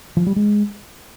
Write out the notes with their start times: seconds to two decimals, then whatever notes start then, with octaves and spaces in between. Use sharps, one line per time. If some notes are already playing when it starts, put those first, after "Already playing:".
0.17 F3
0.27 G3
0.36 G#3